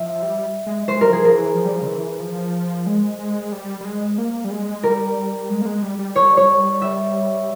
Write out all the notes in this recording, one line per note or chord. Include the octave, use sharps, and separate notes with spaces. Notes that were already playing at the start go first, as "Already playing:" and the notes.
Already playing: F3 E5
G3
G#3
G#3 C5
G3 A#4
F3 G#4
A#4
E3
F3
G3
F3
C#3
E3
F3
G#3
G#3
G3
G3
G#3
A#3
G3
G#3
G3 A#4
G#3
A#3
G#3
G3
G3
C#5
C#5
E5